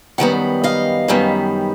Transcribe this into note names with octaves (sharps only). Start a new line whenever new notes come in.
F#2 D#3 G3 B3 F#5
D#5 F5
F#2 D#3 G3 B3